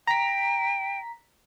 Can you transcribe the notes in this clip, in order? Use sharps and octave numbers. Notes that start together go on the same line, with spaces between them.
G5 A#5 B6